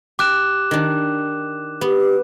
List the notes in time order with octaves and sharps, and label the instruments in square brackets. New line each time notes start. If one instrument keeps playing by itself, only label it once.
[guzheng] G4 [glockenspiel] D6 F#6 E7
[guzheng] D#3 D4
[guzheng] B3 [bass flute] G4